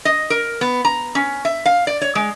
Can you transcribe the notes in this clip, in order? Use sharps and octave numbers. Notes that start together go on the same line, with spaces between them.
D#5
A#4
B3
A#5
C#4
E5
F5
D5
C#5
G#3